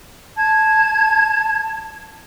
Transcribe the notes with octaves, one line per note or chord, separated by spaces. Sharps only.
A5 G#6